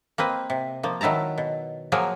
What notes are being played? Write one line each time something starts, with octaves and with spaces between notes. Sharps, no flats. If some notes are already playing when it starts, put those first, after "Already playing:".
A#3 C4 B4 D#5
C3
F3 A#3
D#3 F#3 E4 A5 A#5
B2
F3 F#3 A#3 G#4 A#4 C#5